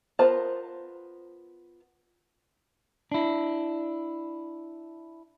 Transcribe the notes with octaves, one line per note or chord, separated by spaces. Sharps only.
B3 F4 A#4 C5 A5
D4 E4